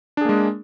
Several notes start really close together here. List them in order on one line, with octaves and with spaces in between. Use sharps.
D4 G#4 A#3 G#3